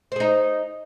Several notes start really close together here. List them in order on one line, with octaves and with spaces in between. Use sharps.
C5 G#4 D#4